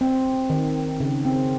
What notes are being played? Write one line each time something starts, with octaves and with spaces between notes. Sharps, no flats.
C4
D#3
C#3
C4